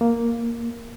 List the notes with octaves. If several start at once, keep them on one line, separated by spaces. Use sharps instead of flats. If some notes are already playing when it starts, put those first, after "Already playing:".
A#3